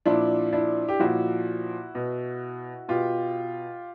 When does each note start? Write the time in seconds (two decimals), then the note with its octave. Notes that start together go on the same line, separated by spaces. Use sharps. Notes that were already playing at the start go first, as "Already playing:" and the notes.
0.05 A#2 F3 D4 E4
0.53 D4 E4
0.88 G4
1.00 A#2 F3 E4 F#4
1.95 B2
2.88 B2 F4 G4